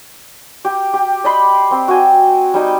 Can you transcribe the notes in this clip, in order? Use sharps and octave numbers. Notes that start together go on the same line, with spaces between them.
G4
G4
D5 D#5 B5 C6
C4
F#4 G5 G#5
G3 D#4 D#5